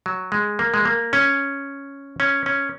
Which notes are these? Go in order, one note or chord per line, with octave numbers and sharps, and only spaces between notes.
F#3
G#3
A#3
G#3
A#3
C#4
C#4
C#4